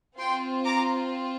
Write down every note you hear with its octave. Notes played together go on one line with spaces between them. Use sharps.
C4 F4 G5 C6
A#5 D6